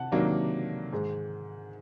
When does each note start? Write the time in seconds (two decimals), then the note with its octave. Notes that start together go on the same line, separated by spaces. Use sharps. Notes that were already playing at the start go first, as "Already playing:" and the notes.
Already playing: C3 F#5 A5
0.12 C3 D#3 F#3 A#3 D4
0.92 G#2 D#3 G#3